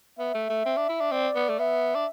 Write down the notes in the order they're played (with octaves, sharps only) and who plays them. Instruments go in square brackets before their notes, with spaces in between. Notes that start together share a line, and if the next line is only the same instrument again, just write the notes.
[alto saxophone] B3 [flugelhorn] E5
[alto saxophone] A3
A3
C4
D4
E4
D4
[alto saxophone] C4 [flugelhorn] D5
[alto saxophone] B3
A3
[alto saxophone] B3 [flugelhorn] E5
[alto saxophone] D4